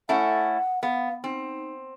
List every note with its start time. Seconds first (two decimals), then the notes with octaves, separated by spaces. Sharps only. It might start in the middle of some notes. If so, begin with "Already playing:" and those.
0.09 A3 C#4 E4 F#5
0.83 B3 F5
1.24 C4 D#4